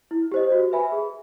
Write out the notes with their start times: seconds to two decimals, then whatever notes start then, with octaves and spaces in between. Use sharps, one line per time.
0.11 E4
0.32 G4 C5 D#5
0.52 F#4
0.71 B4 E5 G#5 B5
0.92 G#4